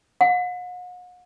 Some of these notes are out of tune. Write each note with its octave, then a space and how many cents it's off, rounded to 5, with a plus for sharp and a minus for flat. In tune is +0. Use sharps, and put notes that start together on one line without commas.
F#5 -45